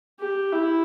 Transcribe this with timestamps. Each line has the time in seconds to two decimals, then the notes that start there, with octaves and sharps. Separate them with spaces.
0.20 G4
0.52 E4